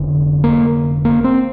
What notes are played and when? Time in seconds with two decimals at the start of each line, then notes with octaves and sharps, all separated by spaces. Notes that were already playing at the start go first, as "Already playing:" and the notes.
Already playing: F1 D3
0.44 A#3
1.05 A#3
1.24 C4